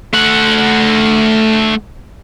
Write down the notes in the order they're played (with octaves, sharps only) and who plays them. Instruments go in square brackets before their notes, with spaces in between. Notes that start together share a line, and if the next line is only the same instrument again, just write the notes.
[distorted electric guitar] A3 F#5